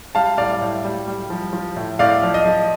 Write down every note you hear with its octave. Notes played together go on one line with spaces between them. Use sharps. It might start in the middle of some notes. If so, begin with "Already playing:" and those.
G3 F5 A5
A2 D5 F5
A2
G3
G3
F3
F3
A2
A2 D5 F5
F3
D#5
F3